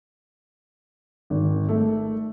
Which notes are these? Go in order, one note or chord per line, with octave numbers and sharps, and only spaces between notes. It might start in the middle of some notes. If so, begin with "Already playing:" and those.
G#1
A3